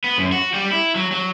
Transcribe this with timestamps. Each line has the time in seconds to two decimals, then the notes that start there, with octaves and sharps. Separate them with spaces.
0.04 B3
0.18 F#2
0.32 F#4
0.54 G3
0.71 E4
0.95 F#3
1.11 F#3